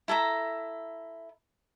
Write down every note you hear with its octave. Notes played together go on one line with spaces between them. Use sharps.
E4 A4 E5 A#5